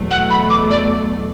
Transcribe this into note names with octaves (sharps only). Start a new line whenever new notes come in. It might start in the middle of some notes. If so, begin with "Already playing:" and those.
Already playing: E2 B2 F#3 A3
F#5
B5
D6
D5